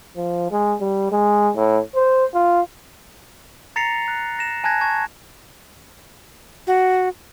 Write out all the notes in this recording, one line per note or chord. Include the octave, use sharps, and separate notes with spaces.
F3
G#3
G3
G#3
A2
C5
F4
A#5 A6 A#6 C7 C#7 F7
F#6
A#6 E7
G#5 A5 F#6 G#6 A#6
A5 C#6 G#6
F#4